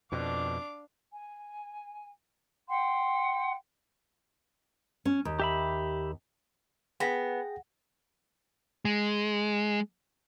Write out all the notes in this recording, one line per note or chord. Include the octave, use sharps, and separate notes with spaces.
F2 B2 D4 F5 D6
G#5
F#5 G5 C6
C#4
D#2
G4 E5 B5
B3 G#4 G5 A#6
G#3